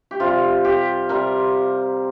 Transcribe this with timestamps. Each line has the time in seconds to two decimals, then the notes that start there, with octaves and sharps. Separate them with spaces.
0.11 G4
0.20 C3 G3 F4
0.65 G4
1.09 C3 G3 A#4